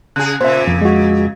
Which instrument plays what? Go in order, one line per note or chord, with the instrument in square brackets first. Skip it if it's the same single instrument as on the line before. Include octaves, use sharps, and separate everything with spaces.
[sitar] C#3 G#4 [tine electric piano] F#6
[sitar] A#2 C#3 [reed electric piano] C5 E5
[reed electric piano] F2
[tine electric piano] G#3 F#4